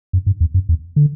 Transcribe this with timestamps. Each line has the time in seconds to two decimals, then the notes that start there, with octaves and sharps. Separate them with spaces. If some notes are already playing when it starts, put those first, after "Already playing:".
0.13 F#2
0.26 G2
0.40 E2
0.54 F#2
0.69 E2
0.96 D3